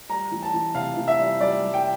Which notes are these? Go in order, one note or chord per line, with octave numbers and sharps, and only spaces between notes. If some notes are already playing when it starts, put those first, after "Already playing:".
G3 A#5
E3
A5
E3
C3 F5
E3
E5
G3
G3 D5
G3
G5